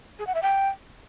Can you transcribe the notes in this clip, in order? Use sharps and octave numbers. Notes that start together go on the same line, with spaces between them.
G#4
F#5
E5
G5